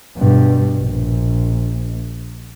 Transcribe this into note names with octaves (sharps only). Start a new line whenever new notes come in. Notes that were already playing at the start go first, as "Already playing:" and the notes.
G2 B2
A#1